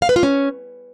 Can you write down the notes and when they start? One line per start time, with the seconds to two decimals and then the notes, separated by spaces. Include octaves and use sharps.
0.02 F5
0.09 B4
0.16 F4
0.23 C#4